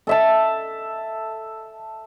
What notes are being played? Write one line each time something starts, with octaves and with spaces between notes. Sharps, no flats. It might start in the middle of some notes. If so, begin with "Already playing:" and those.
A4 E5 A5